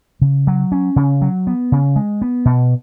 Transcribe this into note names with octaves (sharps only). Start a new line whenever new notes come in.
C#3
F#3
C#4
C#3
F#3
B3
C#3
G#3
B3
B2